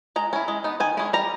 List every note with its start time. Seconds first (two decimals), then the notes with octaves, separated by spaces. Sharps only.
0.16 G#3 A#5
0.33 C#4 E4
0.48 G#3
0.64 B3 D#4
0.80 D#3 G#5
0.97 G#3 C#4 E4
1.13 G3 A#5